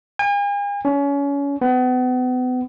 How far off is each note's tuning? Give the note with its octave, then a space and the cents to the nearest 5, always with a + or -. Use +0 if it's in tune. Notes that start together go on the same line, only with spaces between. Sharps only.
G#5 -45
C#4 +30
B3 +35